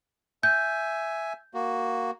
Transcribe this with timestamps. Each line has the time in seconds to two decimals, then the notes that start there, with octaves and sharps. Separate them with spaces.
0.43 E5 G#5 G6
1.54 A#3 F#4